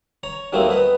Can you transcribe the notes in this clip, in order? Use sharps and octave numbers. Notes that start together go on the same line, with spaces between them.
C#5 A#5
D#2 D#3 F#3 A3 A#3 C4
B3 B4 D#5